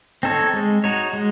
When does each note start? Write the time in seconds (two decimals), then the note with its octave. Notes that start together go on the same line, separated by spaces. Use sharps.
0.23 C4 D#4 A4 C#5
0.53 G#3
0.84 D#4 F#4 C#5
1.13 G#3